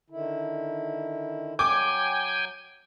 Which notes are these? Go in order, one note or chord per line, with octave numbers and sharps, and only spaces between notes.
D3 D#3 E4
F#3 G5 G#5 D6